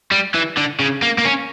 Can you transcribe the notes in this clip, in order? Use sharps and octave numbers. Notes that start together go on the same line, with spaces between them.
G3
E3
D3
C#3
A#3
A#3
C#4